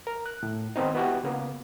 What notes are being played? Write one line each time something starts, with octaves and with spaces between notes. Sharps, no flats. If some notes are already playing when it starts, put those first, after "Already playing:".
A#4
F#6
A2
D#3 B3 C4 D#4
B3 E4 F#4 G4
C#3 A#3 B3